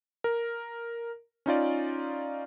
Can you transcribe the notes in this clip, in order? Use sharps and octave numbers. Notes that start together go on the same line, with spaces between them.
A#4
C#4 D#4 F4 D5